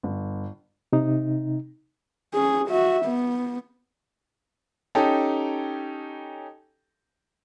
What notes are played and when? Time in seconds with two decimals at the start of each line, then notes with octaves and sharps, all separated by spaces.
0.03 G1
0.93 C3 D#4
2.34 C#4 G#4
2.68 F#4 E5
3.05 B3
4.95 C#4 D#4 G4 A4 G5 A5